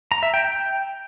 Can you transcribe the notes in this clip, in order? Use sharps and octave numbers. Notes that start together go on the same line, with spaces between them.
A#5
E5
G5
G5